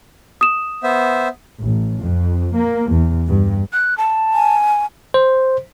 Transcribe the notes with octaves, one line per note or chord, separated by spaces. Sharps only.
D#6 E7
B3 C5 E5
A1
F2
A#3
E2
G2
F#6
A5
G#5
C5